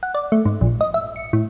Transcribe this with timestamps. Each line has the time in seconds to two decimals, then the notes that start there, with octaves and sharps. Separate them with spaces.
0.03 F#5
0.15 D5
0.32 A3
0.45 G#2
0.61 A#1
0.81 D#5
0.94 E5
1.16 C#7
1.33 A2